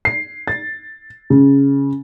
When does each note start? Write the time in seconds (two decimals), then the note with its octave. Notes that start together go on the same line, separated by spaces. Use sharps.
0.05 C7
0.47 A6
1.30 C#3